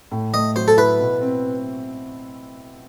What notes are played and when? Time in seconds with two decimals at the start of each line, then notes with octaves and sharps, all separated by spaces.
0.11 A2
0.34 A3 D#5
0.56 F#3 C5
0.68 A4
0.77 E4 B4
1.00 B2
1.21 C4